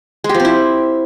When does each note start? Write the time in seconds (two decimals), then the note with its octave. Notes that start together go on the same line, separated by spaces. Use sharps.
0.24 G#3
0.29 G4
0.35 F3
0.40 C4
0.45 E4